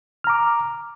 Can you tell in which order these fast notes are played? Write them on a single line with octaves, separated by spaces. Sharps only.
F6 A#5 D6